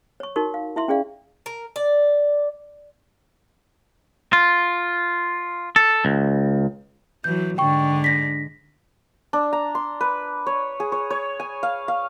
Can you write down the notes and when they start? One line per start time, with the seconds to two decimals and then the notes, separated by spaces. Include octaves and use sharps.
0.20 C#5 C#6
0.36 D#4 F#4 A#4 C#6
0.54 F5
0.76 E4 E5 C6
0.88 C#4 G#4 D5 F5
1.46 A#4
1.76 D5
4.33 F4
5.76 A4
6.05 C#2
7.24 E3 F#3 G6
7.58 G#2 D3 G5 C#6
8.04 D4 A#6 B6
9.33 D4
9.53 A#5
9.75 C6
10.01 B4
10.47 C#5
10.80 G#4
10.92 C#5
11.10 C#5
11.40 G#5
11.63 F5
11.88 F5